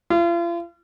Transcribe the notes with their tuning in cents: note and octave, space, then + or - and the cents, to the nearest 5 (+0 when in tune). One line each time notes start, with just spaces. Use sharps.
F4 -40